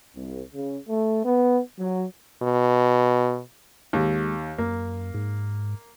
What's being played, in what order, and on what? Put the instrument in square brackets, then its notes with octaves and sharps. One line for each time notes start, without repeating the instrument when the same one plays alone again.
[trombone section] C2
C#3
A3
B3
F#3
[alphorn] B2
[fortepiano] D#2 [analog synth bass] G#3
[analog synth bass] F#2 [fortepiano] A#3
[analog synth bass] G#2